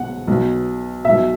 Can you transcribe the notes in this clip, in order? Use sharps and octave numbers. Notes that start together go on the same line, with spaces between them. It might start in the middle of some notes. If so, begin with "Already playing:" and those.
Already playing: B1 B2 F#5
B1 B2
B1 B2 E5